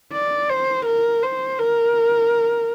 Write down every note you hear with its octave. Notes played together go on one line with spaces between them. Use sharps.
D5
C5
A#4
C5
A#4